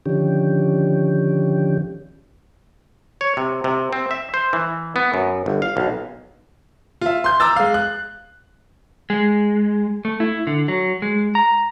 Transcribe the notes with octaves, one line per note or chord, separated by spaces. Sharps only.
D3 D#3 F3 C#4 G4
C#5
C3
C3
C4
E5
C5
E3
B3
F#2
G1
F5
B1
F4 E5
C6 G6
A#5 D6 E6 A6
G#3 F5
F#6
G#3
A3
E4
D3
F#3
G#3
A#5